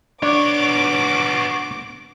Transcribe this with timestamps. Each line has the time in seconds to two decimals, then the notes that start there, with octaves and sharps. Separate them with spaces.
0.22 B3 D4 C#5 D6